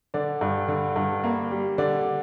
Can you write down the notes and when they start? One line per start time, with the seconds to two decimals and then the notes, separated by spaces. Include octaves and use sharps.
0.14 D3 D5
0.41 G2
0.68 D3
0.96 G2
1.24 A#3
1.51 G3
1.78 D3 D5